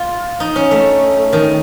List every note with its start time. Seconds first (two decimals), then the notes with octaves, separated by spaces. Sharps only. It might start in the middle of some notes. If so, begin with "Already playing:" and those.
Already playing: F4
0.40 D#4
0.56 C#4
0.71 A3
1.33 D#3